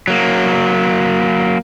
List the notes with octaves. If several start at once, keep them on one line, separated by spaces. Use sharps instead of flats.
F#3 A#3